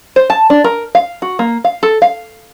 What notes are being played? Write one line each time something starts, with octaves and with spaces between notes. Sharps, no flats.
C5
A5
D4
A#4
F5
F#4
A#3
F5
A4
F5